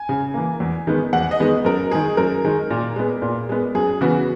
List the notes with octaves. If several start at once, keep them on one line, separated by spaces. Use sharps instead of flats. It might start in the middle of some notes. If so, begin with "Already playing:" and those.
Already playing: G#5
C#3
E3 A#3
E2
D#3 G#3 B3
E2 F#5
D#5
D#3 G#3 B3
F#2 A#4
D#3 G#3 G#4
F#2 A#4
D#3 G#3
A#2
G#3 B3
A#2
G#3 B3
F#2 G#4
C#3 E3 B3 F#4